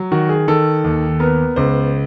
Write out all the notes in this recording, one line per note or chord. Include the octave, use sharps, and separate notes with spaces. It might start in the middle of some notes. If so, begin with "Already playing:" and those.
Already playing: F#3
D#3 F#4
G#4
D#3 A4
D#2
B3 A#4
C#2 C5